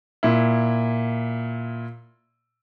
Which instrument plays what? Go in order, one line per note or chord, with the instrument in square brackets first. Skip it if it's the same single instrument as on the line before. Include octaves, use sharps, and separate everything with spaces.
[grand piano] A#2 E4